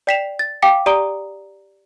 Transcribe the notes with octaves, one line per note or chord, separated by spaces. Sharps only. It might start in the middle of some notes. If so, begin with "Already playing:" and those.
D5 G5 B6 C7 E7 F7
A6
F5 G5 D6 B6 C#7
G4 D5 A#5 D#6 D7 G7